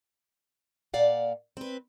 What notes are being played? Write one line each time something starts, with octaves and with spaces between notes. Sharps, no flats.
A#2 D5 F5 F#5
C4 B4